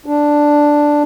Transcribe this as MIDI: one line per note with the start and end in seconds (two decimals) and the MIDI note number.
0.06 1.03 62